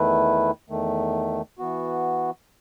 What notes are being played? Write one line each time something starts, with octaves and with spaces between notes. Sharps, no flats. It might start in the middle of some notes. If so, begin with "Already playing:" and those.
Already playing: E2 D#3 A3 E4 B4
E2 D#3 A3
E3 B3 F#4